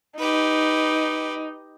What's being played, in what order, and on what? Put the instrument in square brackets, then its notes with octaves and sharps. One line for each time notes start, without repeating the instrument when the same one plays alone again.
[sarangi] D#4 [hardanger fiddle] G4 B4